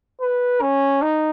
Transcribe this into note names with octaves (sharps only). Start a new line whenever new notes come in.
B4
C#4
D#4